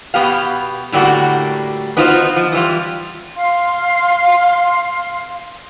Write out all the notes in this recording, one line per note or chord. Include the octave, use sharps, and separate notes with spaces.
B2 E3 B3 G4 F5
A2 D3 G3 A#3 F#4
B3 D4 D#4 F4 F#4 C5
F3
E3 G3 F4
F5 C6